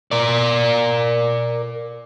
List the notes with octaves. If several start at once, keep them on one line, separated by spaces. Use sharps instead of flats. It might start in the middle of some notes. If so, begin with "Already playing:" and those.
A#4 D5